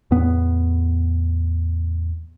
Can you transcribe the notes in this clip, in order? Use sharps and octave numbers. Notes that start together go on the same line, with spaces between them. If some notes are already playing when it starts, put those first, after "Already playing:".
E2 A2 B3